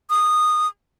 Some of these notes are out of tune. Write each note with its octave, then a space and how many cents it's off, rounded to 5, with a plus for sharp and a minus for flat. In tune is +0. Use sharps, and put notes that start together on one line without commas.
D#6 -15